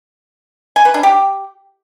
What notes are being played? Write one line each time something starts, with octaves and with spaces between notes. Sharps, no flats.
G#5
B4
D4
G4